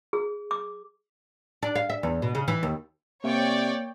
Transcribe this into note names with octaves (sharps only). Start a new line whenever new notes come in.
G#4
D6
D4
F5
E5
E2
B2
C#3
E3
D#2
C3 A#3 C#5 D5 G5